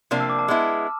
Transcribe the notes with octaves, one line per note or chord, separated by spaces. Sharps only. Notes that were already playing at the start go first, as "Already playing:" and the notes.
C3 F3 A#3 D4 F6
E6
D6
A5
G#3 B3 E4